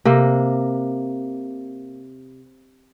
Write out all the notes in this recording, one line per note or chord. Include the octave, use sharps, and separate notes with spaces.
C3 A#3